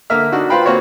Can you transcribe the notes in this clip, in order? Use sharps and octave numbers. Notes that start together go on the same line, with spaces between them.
D3 A#3 A#4 E5 F6
D4 D#4 F#4
F4 B4 C5 F5 G5 B5
A#3 C4 F#4 C#5